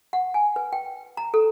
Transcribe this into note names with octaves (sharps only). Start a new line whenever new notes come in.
F#5
G#5
B4
G5
A#5
A4